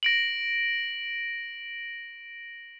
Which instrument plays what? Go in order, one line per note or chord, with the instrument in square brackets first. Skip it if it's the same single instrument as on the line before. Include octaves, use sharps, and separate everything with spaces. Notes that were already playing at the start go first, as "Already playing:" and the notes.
[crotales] A#6 D7 F#7